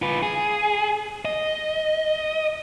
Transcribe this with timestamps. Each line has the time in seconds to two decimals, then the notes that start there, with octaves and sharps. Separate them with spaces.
0.02 F4 B4
0.23 G#4
1.25 D#5